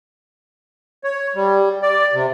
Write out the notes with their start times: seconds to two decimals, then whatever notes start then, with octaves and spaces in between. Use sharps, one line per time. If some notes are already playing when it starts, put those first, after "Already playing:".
1.04 C#5
1.35 G3
1.82 D5
2.14 C3